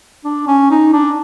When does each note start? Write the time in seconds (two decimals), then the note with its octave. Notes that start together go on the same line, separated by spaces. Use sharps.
0.24 D4
0.47 C#4
0.70 D#4
0.93 D4